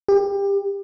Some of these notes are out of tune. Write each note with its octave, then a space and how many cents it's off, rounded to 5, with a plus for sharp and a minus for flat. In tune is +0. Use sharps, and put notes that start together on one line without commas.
G4 +25